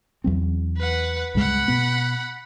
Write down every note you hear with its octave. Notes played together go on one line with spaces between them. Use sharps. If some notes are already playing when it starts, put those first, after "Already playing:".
E2 F#3 C4
B4 F#5
C#2 G2 G#3 F#5 B5
B2 B3